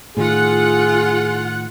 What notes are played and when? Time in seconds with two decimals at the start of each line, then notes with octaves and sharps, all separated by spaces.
0.17 A2 D#3 F4 G#4 F#5